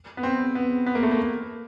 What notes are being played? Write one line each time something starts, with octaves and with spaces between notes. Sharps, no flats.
B3
C4
B3
B3
A#3
A3
A#3